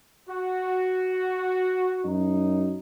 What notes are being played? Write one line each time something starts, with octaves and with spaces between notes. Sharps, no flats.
F#4
F#2 D#4